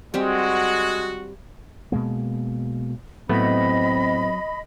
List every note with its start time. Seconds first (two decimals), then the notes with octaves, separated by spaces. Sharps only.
0.14 G3 G#3 C4 F#4 G4
1.92 B2 G#3 A#3
3.29 A2 F#3 A3 B3 C4 D#5 B5